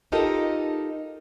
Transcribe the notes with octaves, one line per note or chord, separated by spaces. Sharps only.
D#4 F4 G4 A4 A#4 D#5